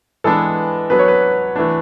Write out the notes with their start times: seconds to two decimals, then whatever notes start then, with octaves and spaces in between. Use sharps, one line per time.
0.24 E3 G#3 B3 D4 A4
0.90 F#3 B3 D4 B4
0.99 C#5
1.08 B4
1.56 E3 A3 D4